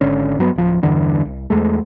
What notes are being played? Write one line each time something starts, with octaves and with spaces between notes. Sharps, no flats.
G#1 D3 C#4
G2 F#3 B3
D1 F3
E2 G2 D3 E3
C2
E2 G#3 A3